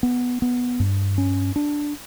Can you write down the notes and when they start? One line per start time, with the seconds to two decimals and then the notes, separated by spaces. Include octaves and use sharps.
0.03 B3
0.42 B3
0.80 G2
1.18 C#4
1.56 D4